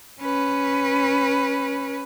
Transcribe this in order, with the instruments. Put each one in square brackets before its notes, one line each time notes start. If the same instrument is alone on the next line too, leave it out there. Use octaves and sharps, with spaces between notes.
[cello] C#4 B4